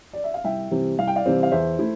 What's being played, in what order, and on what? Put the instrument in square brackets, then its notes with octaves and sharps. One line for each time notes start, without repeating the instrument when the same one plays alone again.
[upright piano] D5
E5
F5
C2 E5 G5
C3 E3 G3 C4
C2 F5
G5
D5 F5
C3 E3 G3 C4
F5
E2 C5 E5
A3 E4